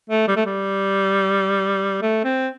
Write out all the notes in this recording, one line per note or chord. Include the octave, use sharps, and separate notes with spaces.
A3
G3
A3
G3
A3
C4